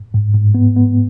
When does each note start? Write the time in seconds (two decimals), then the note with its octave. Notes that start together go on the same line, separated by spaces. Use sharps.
0.14 G#2
0.35 G#2
0.55 B3
0.76 B3